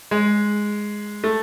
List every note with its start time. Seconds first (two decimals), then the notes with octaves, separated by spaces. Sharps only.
0.11 G#3
1.24 A3